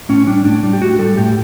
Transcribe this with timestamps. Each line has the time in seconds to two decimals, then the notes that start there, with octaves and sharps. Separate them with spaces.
0.09 A2 C#4
0.27 G3 D4
0.45 A2 D4
0.63 G3
0.73 G4
0.81 A2 F#4
0.99 G3 A4
1.17 A2 G4